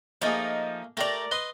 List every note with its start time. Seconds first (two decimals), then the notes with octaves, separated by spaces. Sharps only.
0.22 F3 A3 A#3 D#4 G#4
0.97 A3 G4 A#4 D5 A#5
1.31 B4 D#5 C6